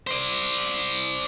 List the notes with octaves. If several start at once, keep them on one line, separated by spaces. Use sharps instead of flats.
C5 D5